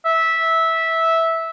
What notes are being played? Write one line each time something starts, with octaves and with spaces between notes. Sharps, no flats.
E5